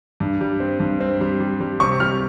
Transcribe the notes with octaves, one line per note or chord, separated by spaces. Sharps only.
G2
G3
C4
G2
C4
G3
G3
G3
C3 C#6
G3 F6